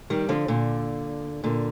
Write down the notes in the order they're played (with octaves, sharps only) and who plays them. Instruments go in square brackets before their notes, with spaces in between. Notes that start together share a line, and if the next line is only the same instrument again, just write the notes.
[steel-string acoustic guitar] D#3 G3
D3 F3
A#2 D3
A#2 D3